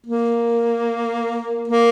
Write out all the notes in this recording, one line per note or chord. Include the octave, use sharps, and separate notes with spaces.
A#3
A#3